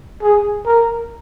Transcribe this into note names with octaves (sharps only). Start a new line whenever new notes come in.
G#4
A#4